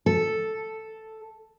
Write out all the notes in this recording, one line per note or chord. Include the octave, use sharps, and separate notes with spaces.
A4